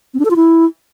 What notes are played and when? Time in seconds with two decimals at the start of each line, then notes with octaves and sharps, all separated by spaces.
0.14 C4
0.19 D4
0.25 A4
0.31 F4
0.36 E4